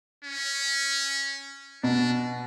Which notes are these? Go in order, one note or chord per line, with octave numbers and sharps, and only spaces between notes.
C#4
B2 D4